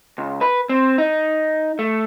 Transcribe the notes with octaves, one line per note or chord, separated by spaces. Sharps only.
C#2
B4
C4
D#4
A3